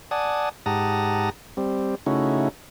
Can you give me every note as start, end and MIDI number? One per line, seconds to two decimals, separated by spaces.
0.11 0.49 74
0.11 0.49 78
0.11 0.49 80
0.11 0.49 81
0.11 0.49 87
0.66 1.30 44
0.66 1.30 67
0.66 1.30 78
0.66 1.30 81
0.66 1.30 82
0.66 1.30 87
1.57 1.95 55
1.57 1.95 60
2.06 2.48 49
2.06 2.48 57
2.06 2.48 61
2.06 2.48 63
2.06 2.48 64
2.06 2.48 66